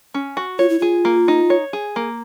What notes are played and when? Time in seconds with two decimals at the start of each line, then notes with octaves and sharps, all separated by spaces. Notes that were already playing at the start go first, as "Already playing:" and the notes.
0.14 C#4
0.37 F#4
0.59 F4 C#5
0.70 E4
0.80 F4 G#4
1.05 A#3
1.28 D#4
1.50 C#5
1.73 G#4
1.96 A#3